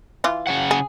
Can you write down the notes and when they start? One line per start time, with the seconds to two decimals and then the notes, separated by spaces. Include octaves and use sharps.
0.24 E3 F4
0.47 C#3 C#5 F#5
0.71 G#4